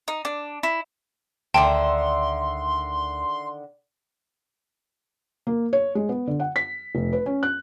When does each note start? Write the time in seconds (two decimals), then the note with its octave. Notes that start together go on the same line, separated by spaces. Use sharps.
0.08 D#4
0.25 D4
0.63 E4
1.54 D2 D3 D#3 E5 G5 A5 C6
5.47 A#3
5.73 C#5
5.95 G#3
6.09 B3
6.27 D3
6.40 F#5
6.56 B6
6.95 F1
7.13 B4
7.26 C#4
7.43 F#6